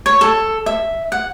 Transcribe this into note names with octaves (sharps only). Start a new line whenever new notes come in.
C#5
A4
E5
F#5